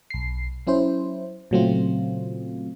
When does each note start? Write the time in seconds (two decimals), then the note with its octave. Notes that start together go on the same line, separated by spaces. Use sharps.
0.10 B1 C7
0.67 F#3 C#4 E4 C5
1.51 A#2 C#3 F#3 A3 C4 F4